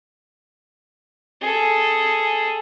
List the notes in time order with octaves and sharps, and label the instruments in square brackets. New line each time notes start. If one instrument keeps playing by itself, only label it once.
[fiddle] G#4 A4